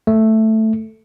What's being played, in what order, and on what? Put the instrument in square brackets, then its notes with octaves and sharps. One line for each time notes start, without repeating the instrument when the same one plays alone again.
[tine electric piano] A3